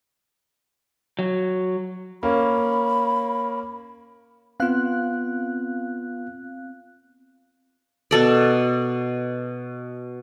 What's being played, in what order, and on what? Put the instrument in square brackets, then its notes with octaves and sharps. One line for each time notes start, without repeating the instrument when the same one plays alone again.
[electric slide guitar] F#3
[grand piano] A#3 C#4 [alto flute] B5
[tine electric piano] B3 F4 [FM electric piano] C4 F5 F#6
[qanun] B2 A4 D5